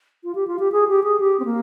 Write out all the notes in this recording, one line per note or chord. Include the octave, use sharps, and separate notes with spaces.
F4
G4
F4
G4
G#4
G4
G#4
G4
C4
A#3